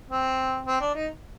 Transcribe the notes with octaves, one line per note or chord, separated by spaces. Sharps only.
C4
C4
D4
D#4